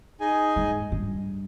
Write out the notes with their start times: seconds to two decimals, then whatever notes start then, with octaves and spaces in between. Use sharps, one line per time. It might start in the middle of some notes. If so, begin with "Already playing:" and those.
0.20 D#4 G#4 D#5 G#5
0.56 G#2
0.92 G2